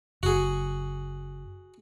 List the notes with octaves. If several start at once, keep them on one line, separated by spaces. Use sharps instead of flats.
F#1 F#4 G#4